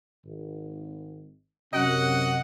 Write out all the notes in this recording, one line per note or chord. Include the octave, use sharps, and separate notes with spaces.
G#1
F#2 C3 F#4 D#5 F#5